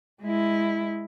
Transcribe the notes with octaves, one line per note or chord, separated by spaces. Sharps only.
G#3 E4